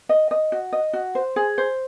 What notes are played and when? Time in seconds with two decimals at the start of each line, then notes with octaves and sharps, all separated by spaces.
0.09 D#5
0.31 D#5
0.52 F#4
0.72 D#5
0.93 F#4
1.15 C5
1.36 G#4
1.58 C5